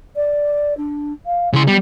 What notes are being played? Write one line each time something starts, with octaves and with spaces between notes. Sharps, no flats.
D5
D4
F5
C#3 E4 C6
G3 B3